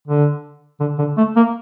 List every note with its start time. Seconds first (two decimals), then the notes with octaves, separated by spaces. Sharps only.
0.08 D3
0.80 D3
0.98 D3
1.17 A3
1.36 A#3